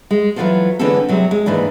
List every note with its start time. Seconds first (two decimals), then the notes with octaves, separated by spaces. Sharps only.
0.11 G#3
0.36 E3 F#3 G3 F4 A4 C5
0.79 D3 E3 G#3 C4 C#4 A4
1.09 C3 F#3 G#3
1.31 G#3
1.46 D#2 G#2 E3 D4